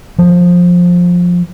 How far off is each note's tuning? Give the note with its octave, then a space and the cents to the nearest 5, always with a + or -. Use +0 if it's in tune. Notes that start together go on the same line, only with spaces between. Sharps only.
F3 +15